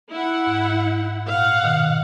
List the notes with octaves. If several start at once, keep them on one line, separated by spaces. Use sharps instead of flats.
E4 F#5
G#2
A#2 F5 F#5
B2 D#3